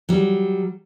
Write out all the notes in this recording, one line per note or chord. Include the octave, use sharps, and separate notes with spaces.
F#3 G3